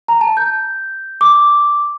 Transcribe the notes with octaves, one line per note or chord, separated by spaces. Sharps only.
A#5
A5
G6
D6